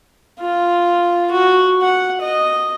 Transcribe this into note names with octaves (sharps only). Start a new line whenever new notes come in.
F4
F#4
F#5
D#5